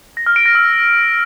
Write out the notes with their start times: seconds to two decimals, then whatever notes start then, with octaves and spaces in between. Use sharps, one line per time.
0.17 A#6
0.26 F6
0.36 D7
0.46 A#6
0.55 E6